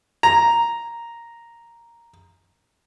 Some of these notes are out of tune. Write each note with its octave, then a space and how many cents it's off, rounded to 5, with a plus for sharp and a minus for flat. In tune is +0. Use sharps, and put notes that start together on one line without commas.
A#5 +0